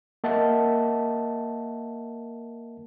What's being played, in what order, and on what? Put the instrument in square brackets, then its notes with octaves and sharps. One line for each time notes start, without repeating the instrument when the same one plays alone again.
[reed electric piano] A#3 A#4 D#5 E5 F#5 A5